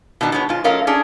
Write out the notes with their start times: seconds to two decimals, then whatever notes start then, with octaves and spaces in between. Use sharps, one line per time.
0.21 B2 D#3 D4 D#4
0.32 B2 G#3 B3 C#5
0.49 G#2 F4
0.64 F#3 A3 C#4 A#4 D#5 F5
0.87 C#4 D4 G#4